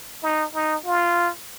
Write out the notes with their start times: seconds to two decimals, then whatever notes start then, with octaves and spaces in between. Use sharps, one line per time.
0.23 D#4
0.54 D#4
0.86 F4